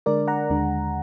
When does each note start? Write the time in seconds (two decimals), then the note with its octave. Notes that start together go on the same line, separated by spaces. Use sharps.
0.06 D3 G#3 D4 A#4 D5
0.28 F#5 A#5
0.50 D#2 D3 G#3 D4